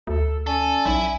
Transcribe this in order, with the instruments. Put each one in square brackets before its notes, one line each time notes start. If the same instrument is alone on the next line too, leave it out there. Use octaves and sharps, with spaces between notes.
[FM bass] D2 [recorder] A4
[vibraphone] C#4 D5 [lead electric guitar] A4 [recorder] G#5
[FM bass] B1 [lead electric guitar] E4